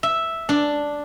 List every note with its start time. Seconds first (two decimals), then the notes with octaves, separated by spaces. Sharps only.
0.03 E5
0.49 D4